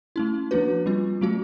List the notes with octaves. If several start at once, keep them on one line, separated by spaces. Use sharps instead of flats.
A3 C#4 E4
F3 A#3 D4 F#4 B4
G3 C4 F4
F#3 A3 C#4 F#4